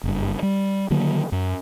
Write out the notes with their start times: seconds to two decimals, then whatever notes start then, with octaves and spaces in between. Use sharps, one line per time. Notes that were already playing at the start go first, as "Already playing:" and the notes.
0.04 F#1 G2
0.43 G3
0.90 D3 D#3 F#3 A#3
1.32 F#2